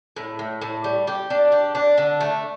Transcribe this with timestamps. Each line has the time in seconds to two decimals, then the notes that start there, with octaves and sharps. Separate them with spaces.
0.16 A2
0.39 A2
0.62 A2
0.84 G3
1.07 G4
1.30 D4
1.52 G4
1.75 D4
1.98 D3
2.21 A3